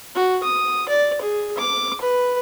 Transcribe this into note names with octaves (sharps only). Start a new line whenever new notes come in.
F#4
D#6
D5
G#4
D6
B4